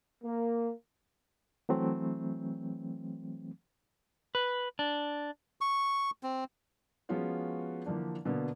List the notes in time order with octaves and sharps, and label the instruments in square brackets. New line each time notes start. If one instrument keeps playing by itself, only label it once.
[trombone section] A#3
[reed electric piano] E3 F#3 A3 C4
[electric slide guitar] B4
D4
[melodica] C#6
C4
[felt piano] F3 G#3 B3 C#4 F4 F#4
D3 E3 F3 A#3 D4
B2 D3 A#3 B3